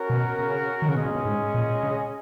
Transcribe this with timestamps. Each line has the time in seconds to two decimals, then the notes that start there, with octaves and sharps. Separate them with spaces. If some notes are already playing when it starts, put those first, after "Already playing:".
Already playing: C#4 F#4 A#4
0.10 B2
0.39 C#3
0.82 D#3
0.89 C#3
0.96 B2 G#3 C#4 G#4 D#5
1.05 A#2
1.16 B2
1.25 G#2
1.54 A#2
1.83 C#3